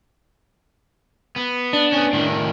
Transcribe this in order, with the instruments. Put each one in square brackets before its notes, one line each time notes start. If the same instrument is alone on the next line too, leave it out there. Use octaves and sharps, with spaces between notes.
[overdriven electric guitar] B3
[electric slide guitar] D4
[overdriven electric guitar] B3 C#4
A2 D#3